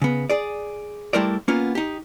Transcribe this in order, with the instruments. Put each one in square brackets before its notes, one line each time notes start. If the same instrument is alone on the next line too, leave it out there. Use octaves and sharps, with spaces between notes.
[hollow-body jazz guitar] C#3 B3
G#4 D5
G3 A3 E4 A#4 C5 D5
A#3 B3 C#4 F4
D#4 G4